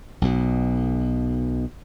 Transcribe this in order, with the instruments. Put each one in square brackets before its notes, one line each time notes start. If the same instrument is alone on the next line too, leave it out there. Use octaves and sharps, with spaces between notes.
[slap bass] B1 B2